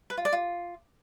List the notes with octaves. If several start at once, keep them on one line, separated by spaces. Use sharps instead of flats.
B4
F4
D5
F4